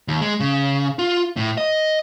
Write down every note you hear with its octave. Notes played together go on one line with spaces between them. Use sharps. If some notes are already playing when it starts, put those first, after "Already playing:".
D#2
G#3
C#3
F4
A2
D#5